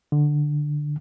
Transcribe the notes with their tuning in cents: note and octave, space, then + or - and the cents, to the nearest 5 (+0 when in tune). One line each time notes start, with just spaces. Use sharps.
D3 +10